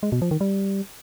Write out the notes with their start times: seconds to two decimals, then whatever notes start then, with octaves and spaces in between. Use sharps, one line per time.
0.03 G#3
0.12 B2
0.22 F3
0.31 D#3
0.41 G3